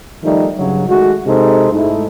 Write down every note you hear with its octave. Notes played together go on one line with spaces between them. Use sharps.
D#3 F3 G3 A3 D#4
G2 C#3 F#3
D#3 G#3 A3 F#4
C3 G#3 D#4 A4 C5
G#2 G#3 A3 D#4 E4